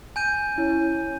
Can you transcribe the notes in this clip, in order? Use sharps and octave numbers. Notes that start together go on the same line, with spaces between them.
G#5 G6 D#7
C#4 E4